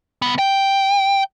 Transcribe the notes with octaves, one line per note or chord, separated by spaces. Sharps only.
C2 B3
G5